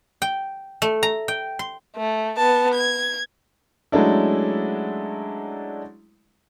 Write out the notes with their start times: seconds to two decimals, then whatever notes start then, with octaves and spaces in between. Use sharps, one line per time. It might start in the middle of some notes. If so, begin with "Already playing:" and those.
0.22 G5
0.82 A3
1.03 A#5
1.28 G5
1.59 C6
1.96 A3
2.37 B3 A5
2.74 G#6
3.92 F#3 G#3 A3 C#4 D4 E4